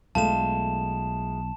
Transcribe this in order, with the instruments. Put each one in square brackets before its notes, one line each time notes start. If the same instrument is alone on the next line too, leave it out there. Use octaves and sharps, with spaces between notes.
[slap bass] B1 [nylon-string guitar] G#3 A3 F4 [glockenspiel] A5 E7